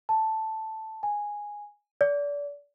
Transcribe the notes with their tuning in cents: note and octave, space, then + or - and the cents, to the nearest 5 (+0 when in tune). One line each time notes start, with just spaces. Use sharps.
A5 +0
G#5 -5
D5 -30